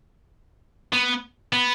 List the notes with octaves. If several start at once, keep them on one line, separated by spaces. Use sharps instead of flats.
B3
B3